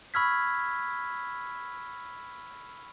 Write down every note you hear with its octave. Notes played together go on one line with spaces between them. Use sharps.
B5 C#6 E6 F6 G#6 B6